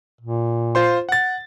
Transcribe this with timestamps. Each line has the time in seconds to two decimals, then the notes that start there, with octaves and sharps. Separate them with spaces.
0.21 A#2
0.75 F4 C5 C6
1.09 F#5 A6